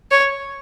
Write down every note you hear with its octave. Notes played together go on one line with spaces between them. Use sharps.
C#5